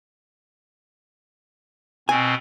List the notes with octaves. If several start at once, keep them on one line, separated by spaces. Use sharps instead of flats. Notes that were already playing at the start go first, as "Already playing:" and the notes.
B2 C4 G#5